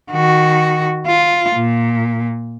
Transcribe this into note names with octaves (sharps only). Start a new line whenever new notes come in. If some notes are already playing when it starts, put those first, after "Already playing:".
D#3 F#4
F4
A#2